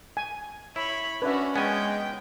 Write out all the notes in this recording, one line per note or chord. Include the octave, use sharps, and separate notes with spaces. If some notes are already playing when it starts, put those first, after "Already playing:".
G#5
E4 C#5 B5
C#4 D4 F#4 B4 E5
G#3 B3 C#4 G5 G#5